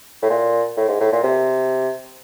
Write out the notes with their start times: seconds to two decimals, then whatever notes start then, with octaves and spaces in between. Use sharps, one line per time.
0.22 A2
0.30 A#2
0.77 A2
0.88 G#2
1.00 A2
1.12 A#2
1.23 C3